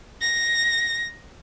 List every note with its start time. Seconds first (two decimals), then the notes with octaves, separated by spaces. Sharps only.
0.22 A#6